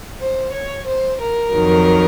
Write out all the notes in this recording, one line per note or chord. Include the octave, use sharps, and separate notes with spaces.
C5
C#5
C5
A#4
F2 D#3 F#3